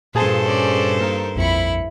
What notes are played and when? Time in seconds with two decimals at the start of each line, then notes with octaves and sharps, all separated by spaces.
0.15 G2 A#2 F4 G#4 A4 C5 A5
0.45 C#4 D5
1.00 A#3 D#4 A#4
1.36 A#1 F2 E4 B5 C#7